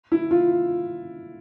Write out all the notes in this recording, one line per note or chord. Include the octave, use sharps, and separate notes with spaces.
E4
F4